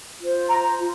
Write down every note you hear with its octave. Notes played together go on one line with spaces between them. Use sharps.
F4 C5
A#5
F4